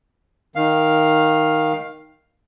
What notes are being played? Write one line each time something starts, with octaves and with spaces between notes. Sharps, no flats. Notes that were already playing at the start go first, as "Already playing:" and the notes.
D#3 F5